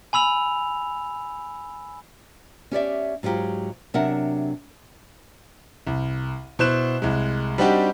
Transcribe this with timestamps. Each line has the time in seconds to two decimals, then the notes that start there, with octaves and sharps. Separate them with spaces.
0.13 G#5 B5 E6 F7
2.71 C#4 G4 D5 E5
3.23 G#2 F#3 F4 G4
3.94 C3 F#3 D4 A#4 E5 F#5
5.87 C2
6.59 B2 E4 C5 F#6 E7
7.02 C2 G#3
7.58 G3 C4 D4 D#4 F#4 G4